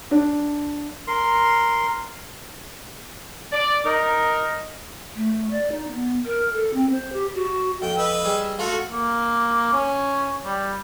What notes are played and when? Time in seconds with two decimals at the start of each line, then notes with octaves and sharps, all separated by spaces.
0.11 D4
1.07 A#4 C6
3.52 D5
3.85 D#4 A#4
5.15 A3
5.51 D5
5.72 D#4
5.88 B3
6.25 A#4
6.53 A4
6.74 C4
6.90 C5
7.12 G4
7.34 F#4
7.82 F2 G5
7.98 B4 D#5 E6
8.25 G3 G#4
8.59 A3 F4 F#4 A4 F5
8.92 A#3
9.72 C#4
10.45 G3